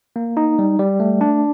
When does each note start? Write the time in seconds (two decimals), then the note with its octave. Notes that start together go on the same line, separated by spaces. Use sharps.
0.16 A#3
0.37 D#4
0.59 G3
0.79 G3
1.00 A3
1.21 D4